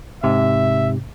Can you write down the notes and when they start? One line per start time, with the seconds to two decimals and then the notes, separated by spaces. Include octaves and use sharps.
0.24 G#2 C3 E5